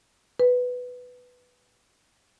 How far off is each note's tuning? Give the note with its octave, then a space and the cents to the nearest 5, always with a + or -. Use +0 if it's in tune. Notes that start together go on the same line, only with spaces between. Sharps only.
B4 +5